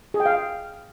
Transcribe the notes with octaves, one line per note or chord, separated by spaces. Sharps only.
G#4
G5
F5